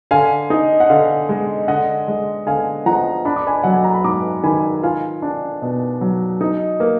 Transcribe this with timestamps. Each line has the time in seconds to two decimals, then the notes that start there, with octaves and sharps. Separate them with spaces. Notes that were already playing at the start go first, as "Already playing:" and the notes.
0.11 D3 F5 G#5
0.50 D#4
0.80 F#5
0.89 D3 F5
1.29 G#3
1.68 D3 D#5 F#5
2.08 G#3
2.47 D3 F5 G#5
2.86 F3 F#5 A#5
3.25 D4 B5
3.36 D6
3.47 G#5 B5
3.64 F#3 F#5
3.74 G#5
3.84 A#5
3.94 B5
4.04 G#2 A#5 D6
4.43 D#3 G#5 B5
4.83 F4 F5 G#5
5.22 D4
5.62 B2
6.01 F#3
6.41 D#4
6.80 A#3